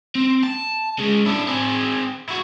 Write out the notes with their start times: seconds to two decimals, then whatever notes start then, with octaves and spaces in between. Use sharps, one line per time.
0.15 C4
0.44 A5
0.99 C#3 G#3
1.26 D4 E4
1.48 C4 G#4
2.28 E4 F#4